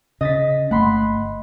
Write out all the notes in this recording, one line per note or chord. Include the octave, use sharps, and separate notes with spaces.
C#3 D#5 A6 B6
G1 A3 F#5 B5 C6